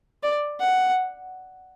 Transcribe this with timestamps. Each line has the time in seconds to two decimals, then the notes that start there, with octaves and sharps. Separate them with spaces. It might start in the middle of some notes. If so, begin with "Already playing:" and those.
0.23 D5
0.59 F#5